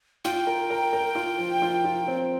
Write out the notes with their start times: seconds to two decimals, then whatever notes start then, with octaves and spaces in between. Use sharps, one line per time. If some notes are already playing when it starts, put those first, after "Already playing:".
0.25 F4 G5
0.47 A#4
0.70 A#4
0.93 A#4
1.15 F4
1.38 F3
1.62 F4
1.84 F4
2.08 C4